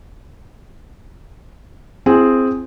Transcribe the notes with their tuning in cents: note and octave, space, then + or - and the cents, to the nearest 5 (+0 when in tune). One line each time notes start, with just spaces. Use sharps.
C4 +0 E4 +40 G#4 +0